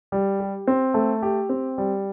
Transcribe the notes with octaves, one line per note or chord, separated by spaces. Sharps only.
G3
G4
C4
A3
G4
C4
G3